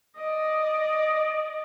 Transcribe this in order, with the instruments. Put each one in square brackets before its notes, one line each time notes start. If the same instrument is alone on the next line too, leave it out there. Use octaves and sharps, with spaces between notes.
[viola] D5 D#5